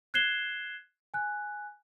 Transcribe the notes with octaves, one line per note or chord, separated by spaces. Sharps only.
F#6 G#6 C7 E7 G7
G#5 F#6